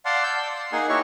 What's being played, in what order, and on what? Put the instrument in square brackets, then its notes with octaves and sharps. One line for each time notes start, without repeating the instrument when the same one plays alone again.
[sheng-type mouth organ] D5 F5 F#5 A5 C6
E6 G6
D5
C6
A#3 D#4 G#4 F#5 G#5
E4 F#4 G4 C#5 C#6